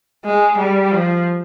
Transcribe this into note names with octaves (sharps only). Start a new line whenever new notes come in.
G#3
G3
F3